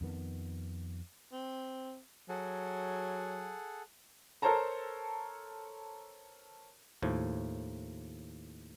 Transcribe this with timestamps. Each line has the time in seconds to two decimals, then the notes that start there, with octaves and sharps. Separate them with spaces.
0.01 F2 D#3 B3
1.32 C4
2.29 F#3 G#4 A4 F#5
4.42 A4 A#4 C5 C#5 A5 A#5
7.03 D#2 A2 F3